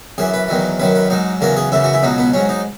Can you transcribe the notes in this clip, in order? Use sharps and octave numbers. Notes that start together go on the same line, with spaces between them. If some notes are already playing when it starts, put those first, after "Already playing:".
F#2 E3 G#4
B4
E2 D#3 F#3
F#2 D#3 F#3 B4
B4
G#2 F#3 D#4
E2 C#3 F#3 A#4
G#4
F#2 C#3 E3 E4
F#4
E4
C#2 B2 F#3 D#4
B3
G#2 F#3 C#4
D#4